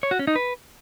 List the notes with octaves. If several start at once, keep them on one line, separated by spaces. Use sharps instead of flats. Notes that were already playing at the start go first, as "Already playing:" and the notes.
C#5
F#4
C#4
D#4
B4